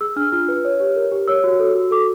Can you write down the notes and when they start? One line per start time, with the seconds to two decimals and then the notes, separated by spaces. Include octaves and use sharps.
0.01 G#4 E6
0.16 D4 F6
0.32 F4 F6
0.48 B4
0.65 C#5
0.80 G4
0.96 A#4
1.12 G4
1.28 C#5 E6
1.44 F#4
1.60 A4
1.75 F#4
1.91 A4 D6